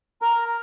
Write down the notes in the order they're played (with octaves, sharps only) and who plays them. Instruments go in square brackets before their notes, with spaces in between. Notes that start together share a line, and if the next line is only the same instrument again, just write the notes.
[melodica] A#4 [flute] A#5